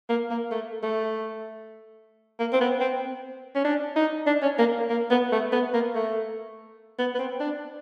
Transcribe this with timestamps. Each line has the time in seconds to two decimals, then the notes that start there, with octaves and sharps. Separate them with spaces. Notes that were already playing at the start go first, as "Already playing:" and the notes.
0.09 A#3
0.31 A#3
0.51 A3
0.83 A3
2.40 A#3
2.53 C4
2.61 B3
2.81 C4
3.55 C#4
3.64 D4
3.96 D#4
4.27 D4
4.42 C#4
4.59 A#3
4.90 A#3
5.10 B3
5.32 A3
5.52 B3
5.73 A#3
5.95 A3
6.99 B3
7.15 B3
7.19 C4
7.40 D4